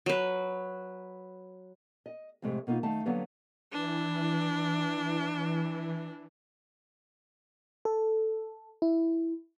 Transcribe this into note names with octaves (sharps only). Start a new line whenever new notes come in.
F#3 B4
D#5
F2 A2 C3 G#3 A3
B2 A#3 D#4 F4
F#2 D#3 A3 F5 A5
D3 F#3 G3 A#3 B3
E3 D4
A4
E4